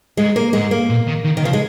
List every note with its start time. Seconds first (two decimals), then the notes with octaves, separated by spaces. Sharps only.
0.17 G#2 G#3
0.36 A#3
0.53 G#2 G#3
0.71 A#3
0.90 A#2
1.07 D#3
1.25 D#3
1.37 D#3
1.43 C#3 F3
1.53 G#3